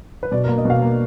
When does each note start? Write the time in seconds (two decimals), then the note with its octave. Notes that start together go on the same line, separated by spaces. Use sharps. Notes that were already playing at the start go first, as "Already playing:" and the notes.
0.23 B4
0.31 B2 D5
0.44 A#3 A#4
0.58 D#5
0.65 B2 F5
0.82 A#3